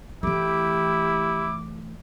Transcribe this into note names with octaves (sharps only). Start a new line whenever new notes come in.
E3 A3 E4 G4 D6